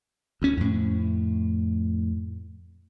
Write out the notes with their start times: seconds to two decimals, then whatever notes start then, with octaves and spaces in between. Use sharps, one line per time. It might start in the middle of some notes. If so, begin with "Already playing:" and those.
0.42 D2 C#4
0.57 F2 A2